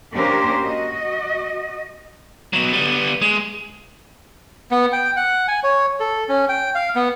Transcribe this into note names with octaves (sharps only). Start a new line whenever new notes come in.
A#3 C#4 D4 G4 A#4 C5
F#4 D#5
B2 F#3
G3 B3
G#3
B3
G5
F#5
G#5
C#5
A4
C#4
G5
F5
B3